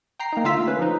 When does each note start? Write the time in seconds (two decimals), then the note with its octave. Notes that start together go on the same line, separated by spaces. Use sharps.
0.19 G5 A#5 C7
0.33 A#3 D#4
0.44 D3 A3 F4 F5 E6 B6
0.67 C#4 B4
0.79 F3 D#4